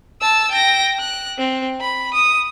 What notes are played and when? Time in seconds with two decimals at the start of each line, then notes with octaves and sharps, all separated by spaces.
0.21 A5 E6
0.51 G5 A#6
1.00 F#6
1.38 C4
1.81 B5
2.14 D#6